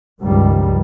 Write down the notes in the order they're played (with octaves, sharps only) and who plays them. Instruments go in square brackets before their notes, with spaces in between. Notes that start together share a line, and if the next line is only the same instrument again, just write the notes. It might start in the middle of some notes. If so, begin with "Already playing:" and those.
[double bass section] C#2 G2 D#3 F3 G3